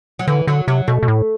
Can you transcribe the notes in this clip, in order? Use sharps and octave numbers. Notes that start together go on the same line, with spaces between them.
F#3
D3 E3
D3 F#3
C3 F#3
B2 A3
B2
A2